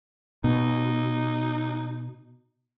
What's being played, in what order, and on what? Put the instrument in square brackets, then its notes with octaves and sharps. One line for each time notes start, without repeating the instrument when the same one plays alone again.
[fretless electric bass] B2 [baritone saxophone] D#4